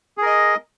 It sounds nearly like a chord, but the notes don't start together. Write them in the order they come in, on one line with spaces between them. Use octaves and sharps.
G#4 A#4 D#5